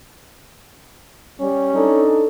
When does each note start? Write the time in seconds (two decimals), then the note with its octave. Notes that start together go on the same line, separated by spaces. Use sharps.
1.40 G3 C#4
1.75 D4 D#4 A4